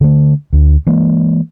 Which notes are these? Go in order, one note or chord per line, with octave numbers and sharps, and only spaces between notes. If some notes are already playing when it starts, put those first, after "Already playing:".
D3 A3
D2
E3 G#3 A#3